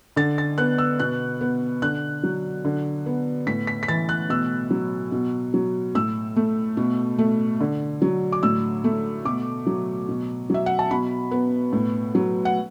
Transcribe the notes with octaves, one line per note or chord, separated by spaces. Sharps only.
D3 A6
A6
B3 F#6
E6
B2 F#6
B3
D3 F#6
F#3
D3
B3
A2 B6
B6
B6
E3 A6
F#6
B2 E6
F#3
B2
F#3
A2 E6
A3
B2
A3
D3
F#3
D6
A2 E6
A3
B2 D6
F#3
B2
F#3 E5
F#5
A5
B2 B5
B3
A2
F#3
F#5